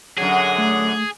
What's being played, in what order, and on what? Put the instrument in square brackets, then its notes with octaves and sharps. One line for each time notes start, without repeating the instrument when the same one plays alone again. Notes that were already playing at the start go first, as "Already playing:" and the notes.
[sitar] F#2 D3 F#3 [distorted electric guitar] G#4
[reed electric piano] A3